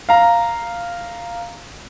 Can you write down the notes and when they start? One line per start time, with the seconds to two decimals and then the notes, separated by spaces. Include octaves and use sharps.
0.09 F5 A#5